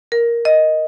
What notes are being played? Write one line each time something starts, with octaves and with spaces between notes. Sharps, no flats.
A#4
D#5